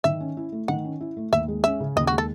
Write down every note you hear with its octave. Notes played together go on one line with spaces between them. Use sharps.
D#3 E5
C#4
E4
A3
D#3 F#5
C#4
E4
A3
D#2 E5
G#3
C#4 E5
C#3
D#2 D#5
F#4
G#3
A4